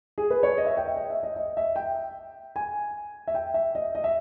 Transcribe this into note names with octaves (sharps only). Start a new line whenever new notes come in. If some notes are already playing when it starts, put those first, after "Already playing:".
G#4
B4
C#5
D#5
E5
G5
E5
D#5
E5
D#5
D#5
E5
G5
G#5
E5
G5
E5
D#5
D#5
E5